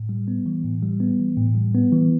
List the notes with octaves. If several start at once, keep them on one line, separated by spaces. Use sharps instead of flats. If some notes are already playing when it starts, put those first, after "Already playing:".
Already playing: A2
G3
B3
E3
A2
G3
B3
E3
A2
G3
B3
E3